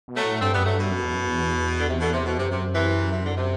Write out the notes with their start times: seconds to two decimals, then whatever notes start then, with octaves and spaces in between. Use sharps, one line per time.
0.08 B2
0.16 F#3 A3
0.24 A2
0.41 G2 A3 C4
0.53 F#2 G3 B3
0.65 G2 F#3 A3
0.78 B2
0.90 F#2
1.03 E2
1.15 F#2
1.27 E2
1.78 D3
1.89 C3
2.00 B2 D3
2.13 C3
2.25 B2
2.37 F#2 C3
2.51 C3
2.74 C3 E3
3.12 E3
3.25 D3
3.36 C3